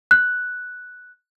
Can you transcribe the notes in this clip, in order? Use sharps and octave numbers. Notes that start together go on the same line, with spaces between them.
F#6